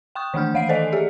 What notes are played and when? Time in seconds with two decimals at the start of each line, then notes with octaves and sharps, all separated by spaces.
0.15 G5 C6 C#6 D#6
0.34 D#3 E3 A3 D4 F6 G6
0.54 E3 F5 F#5 C7 D7
0.69 A4 C5 D5 D#5 G#5
0.92 G4 G#4 E5